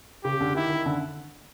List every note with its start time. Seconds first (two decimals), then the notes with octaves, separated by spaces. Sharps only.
0.24 C#3 G4
0.40 D3
0.55 D#3 E4
0.70 D#3
0.86 D3